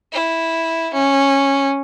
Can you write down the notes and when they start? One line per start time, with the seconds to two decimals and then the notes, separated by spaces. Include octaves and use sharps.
0.12 E4
0.93 C#4